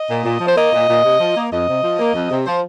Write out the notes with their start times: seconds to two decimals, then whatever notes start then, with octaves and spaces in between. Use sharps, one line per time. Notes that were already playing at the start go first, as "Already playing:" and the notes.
Already playing: D#5
0.08 A#2
0.24 A#2
0.40 F3
0.47 C5
0.56 A#3 D#5
0.72 A#2
0.88 A#2
1.03 C3
1.19 F3
1.35 A#3
1.51 F2 D#5
1.67 C3
1.82 F3
1.99 A#3
2.14 F2
2.30 C3
2.45 F3 C5